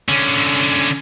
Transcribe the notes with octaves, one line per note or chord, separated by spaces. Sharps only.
D3 C#4